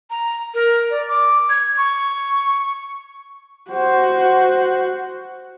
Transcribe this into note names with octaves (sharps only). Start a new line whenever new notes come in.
A#5
A#4
D5
D6
G#6
C#6
F#4 C5